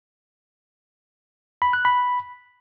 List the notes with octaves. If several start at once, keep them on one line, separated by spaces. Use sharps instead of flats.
B5
F#6
B5